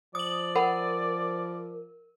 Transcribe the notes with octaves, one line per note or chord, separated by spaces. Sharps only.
F3 D5 D#6 F#7
A#4 F#5 B5